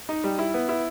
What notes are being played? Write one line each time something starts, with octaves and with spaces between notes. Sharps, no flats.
D#4
G3
E4
B3
E4